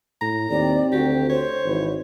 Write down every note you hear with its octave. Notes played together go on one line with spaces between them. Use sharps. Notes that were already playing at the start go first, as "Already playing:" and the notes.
A2 A#5
D#2 C4 D5
D2 F#4 G4
C5 C#5
G#1 E3 B4